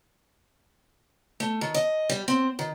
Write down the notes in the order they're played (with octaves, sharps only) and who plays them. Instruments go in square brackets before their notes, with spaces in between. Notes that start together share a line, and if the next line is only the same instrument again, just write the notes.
[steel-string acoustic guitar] A3
D#3
D#5
G3
C4
D#3